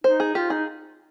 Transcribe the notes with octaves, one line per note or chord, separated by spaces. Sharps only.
D#4 C5
G#4
F4 G4
D#4 G#4